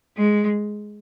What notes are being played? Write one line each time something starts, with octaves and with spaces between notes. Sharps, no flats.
G#3